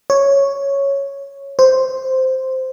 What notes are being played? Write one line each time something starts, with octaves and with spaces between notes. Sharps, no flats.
C#5
C5